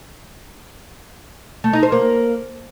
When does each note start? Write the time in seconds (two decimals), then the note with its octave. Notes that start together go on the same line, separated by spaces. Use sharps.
1.64 A3
1.73 D#4
1.83 C5
1.92 A#3